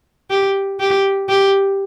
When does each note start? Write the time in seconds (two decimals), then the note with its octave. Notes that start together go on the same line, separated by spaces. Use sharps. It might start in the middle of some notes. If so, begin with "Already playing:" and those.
0.30 G4
0.80 G4
1.29 G4